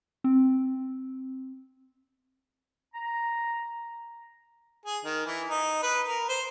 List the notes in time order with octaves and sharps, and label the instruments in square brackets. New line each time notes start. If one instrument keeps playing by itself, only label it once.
[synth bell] C4
[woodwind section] A#5
[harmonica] G#4
D#3
E3
D#4
B4
A#4
C5